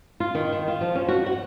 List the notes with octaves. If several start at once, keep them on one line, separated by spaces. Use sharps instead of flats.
F4
D#3
D#3
F4
F3
C#4
F#4
F#5